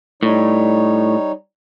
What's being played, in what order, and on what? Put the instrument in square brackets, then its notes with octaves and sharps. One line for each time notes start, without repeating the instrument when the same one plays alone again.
[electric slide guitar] A2 [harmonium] G3 D#4 C#5